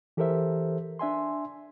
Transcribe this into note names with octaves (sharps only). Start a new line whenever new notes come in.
E3 G4 A4 A#4 C5 E5
D4 E5 G#5 C6